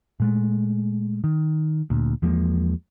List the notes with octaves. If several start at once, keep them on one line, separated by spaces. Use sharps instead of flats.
A#2 G#3 A3
D#3
D2 A#2
E2 F3 G#3 A#3